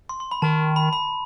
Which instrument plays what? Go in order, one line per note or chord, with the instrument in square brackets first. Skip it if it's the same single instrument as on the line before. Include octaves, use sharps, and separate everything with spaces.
[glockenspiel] C6
C6
B5
[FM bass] D#3 [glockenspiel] A5
[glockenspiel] B5
B5